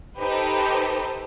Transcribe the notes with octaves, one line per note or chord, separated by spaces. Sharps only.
D#4 G4 A4 B4 C5